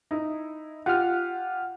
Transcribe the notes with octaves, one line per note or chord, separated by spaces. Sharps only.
D#4 E4
F4 G4 F#5 F6